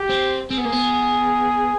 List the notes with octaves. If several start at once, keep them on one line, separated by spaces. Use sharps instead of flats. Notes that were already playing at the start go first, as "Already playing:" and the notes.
Already playing: G4
C4
C4 G#4
B3
A#3
B3